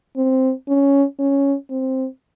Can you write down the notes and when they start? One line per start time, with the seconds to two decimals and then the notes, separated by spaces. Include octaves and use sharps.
0.16 C4
0.68 C#4
1.19 C#4
1.70 C4